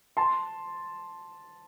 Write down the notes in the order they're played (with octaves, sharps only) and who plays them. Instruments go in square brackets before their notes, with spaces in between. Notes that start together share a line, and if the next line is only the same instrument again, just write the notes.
[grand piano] A5 C6